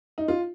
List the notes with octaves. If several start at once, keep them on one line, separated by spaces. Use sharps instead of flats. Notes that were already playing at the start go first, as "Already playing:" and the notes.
D#4
F4